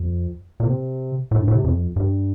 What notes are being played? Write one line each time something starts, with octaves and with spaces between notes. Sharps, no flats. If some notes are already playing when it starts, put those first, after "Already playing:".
Already playing: F2
A#2
C3
A2
G2
A2
C3
F2
G2